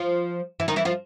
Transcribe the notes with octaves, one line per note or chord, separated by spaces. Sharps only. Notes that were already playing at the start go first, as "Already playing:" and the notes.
Already playing: F3 F4
E3 E4
D#3 D#4
E3 E4
F3 F4